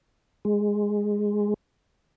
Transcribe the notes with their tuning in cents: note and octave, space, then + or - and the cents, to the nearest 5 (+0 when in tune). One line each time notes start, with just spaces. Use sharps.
G#3 -5